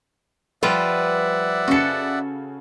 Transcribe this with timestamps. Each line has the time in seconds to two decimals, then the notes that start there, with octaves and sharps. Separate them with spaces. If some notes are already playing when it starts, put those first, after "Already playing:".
0.63 F3 G3 F4 B4 D5 E5 F#5
1.68 C#3 F#4 A4 C#7